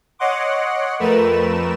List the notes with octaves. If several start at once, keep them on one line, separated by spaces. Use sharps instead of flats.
C#5 D#5 F#5 C6 D6
F2 A3 A#4 B4 E7